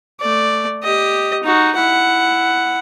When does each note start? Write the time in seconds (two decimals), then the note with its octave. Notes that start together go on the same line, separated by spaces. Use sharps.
0.20 A3 D5
0.83 G4 D#5
1.44 D#4 F#4
1.76 E4 F#5